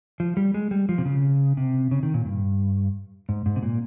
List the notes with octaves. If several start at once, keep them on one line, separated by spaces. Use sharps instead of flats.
F3
G3
G#3
G3
F3
C3
C#3
C3
C#3
D#3
A#2
G2
G#2
G#2
C3
A#2